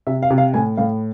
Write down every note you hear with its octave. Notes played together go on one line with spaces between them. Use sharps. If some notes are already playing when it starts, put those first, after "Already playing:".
C3 E5
F5
C3
F5
A2 G#5
A2 F5